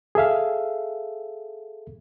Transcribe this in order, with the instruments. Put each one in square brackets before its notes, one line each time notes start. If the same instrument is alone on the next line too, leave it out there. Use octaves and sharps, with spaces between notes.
[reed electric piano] G#4 A4 E5 F5